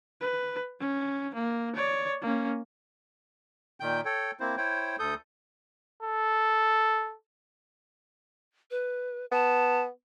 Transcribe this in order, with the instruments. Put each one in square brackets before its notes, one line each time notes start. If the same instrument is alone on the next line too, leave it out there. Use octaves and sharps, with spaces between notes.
[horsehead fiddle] B4
C#4
A#3
C#5 D5
A#3 C#4
[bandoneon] A#2 D#3 G5 G6
A4 C#5 G5
A#3 C4 E4 C5
E4 C5 C#5 G5
D2 A4 D#6 G6
[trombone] A4
[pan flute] B4
[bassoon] B3 [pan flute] A5